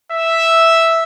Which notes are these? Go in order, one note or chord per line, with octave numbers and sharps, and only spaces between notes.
E5